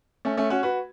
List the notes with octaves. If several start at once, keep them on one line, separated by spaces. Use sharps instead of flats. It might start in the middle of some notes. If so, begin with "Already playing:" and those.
A3 C#4
A3 C#4
C#4 F#4
F#4 B4